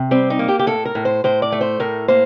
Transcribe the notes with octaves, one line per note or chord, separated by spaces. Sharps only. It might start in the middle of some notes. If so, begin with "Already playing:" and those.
Already playing: C3
G3 C4
D#4
A#3
G4
G4
A2 A4
A#4
A2
C5
A2 C5
D5
A3
C5
A2 A#4
A#3 C5